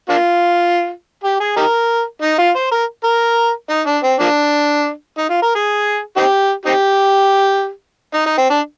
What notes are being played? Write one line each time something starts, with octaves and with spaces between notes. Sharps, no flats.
A#3 D4 F4
G4
G#4
D#4 G4 A#4
D#4
F4
C5
A#4
A#4
D#4
D4
C4
F3 A#3 D4
D#4
F4
A#4
G#4
C4 D#4 G4
C4 D#4 G4
D#4
D#4
C4
D4